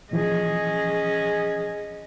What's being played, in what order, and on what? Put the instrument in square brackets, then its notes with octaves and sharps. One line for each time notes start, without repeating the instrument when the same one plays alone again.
[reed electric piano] A#2 E3 F3 [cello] C#4 D#5 [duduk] G#4